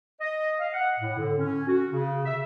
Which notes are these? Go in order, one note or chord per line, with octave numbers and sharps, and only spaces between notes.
D#5
F5
F#5
A2
D3
C#4
F#4
C#3
E5